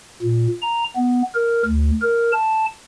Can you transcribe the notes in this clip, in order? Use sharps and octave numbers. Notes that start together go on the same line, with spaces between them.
A#2
A#5
B3
A#4
D2
A#4
A5